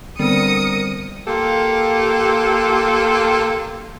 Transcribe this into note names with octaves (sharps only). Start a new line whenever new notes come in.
D3 G3 B3 C4 A#4 D#6 C#7
A#3 F4 G4 A4